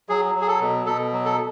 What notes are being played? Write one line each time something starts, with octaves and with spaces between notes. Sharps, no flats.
F#3 G#4
F#3
G#4
A4
B2
B2 A4
F#3
A4